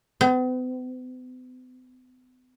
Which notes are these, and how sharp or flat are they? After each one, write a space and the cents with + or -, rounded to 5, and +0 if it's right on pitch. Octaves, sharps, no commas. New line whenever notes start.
B3 +45